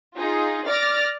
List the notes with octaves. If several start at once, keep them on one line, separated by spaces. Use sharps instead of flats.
D#4 F4 G#4
D5 D6 F6 A6 A#6